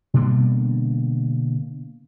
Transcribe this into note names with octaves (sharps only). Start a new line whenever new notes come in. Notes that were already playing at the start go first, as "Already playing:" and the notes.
B2 D3 G3 A#3